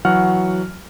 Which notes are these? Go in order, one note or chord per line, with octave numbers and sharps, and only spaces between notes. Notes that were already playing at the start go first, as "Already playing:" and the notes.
E3 F#3 F#4 F#5 F6